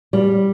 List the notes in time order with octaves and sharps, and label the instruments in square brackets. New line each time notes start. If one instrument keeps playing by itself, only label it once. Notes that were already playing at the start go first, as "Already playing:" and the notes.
[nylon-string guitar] G3